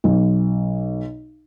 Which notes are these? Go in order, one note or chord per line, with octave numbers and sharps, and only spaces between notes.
B1